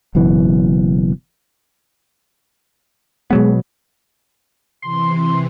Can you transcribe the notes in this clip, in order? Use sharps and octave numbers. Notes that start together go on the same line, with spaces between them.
F#1 F#2 B2 E3
B2 F#3 G#3 B3
C3 E3 C6